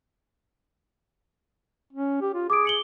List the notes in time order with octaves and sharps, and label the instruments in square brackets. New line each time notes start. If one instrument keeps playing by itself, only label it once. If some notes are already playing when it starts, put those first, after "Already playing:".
[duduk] C#4
G4
F4
[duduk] G#4 [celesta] D6 D#6 D7
[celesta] C#7 F#7 G7